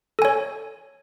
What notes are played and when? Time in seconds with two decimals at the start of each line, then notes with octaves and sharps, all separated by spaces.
0.19 A4
0.22 G#5
0.25 C#5